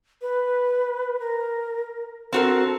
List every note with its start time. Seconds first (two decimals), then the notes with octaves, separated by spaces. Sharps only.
0.22 B4
1.20 A#4
2.33 C4 F#4 A4 A#4